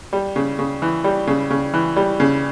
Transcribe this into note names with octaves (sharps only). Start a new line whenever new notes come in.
G3
C#3
C#3
E3
G3
C#3
C#3
E3
G3
C#3